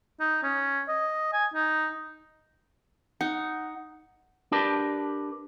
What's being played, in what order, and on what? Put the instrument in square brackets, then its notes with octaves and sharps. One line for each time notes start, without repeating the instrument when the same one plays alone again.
[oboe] D#4
C#4
D#5
G#5
D#4
[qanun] D#4 [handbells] F#5
[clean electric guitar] D4 G4 A#4 B4 D5 A5